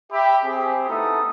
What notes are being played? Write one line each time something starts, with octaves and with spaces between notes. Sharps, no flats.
G4 E5 B5
C4 G4 G#4
A3 B3 D#4 E4 A4 D#6